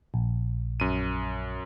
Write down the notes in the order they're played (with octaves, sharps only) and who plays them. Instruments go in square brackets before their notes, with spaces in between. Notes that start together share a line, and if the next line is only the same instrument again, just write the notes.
[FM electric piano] A#1
[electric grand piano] F#2 D#7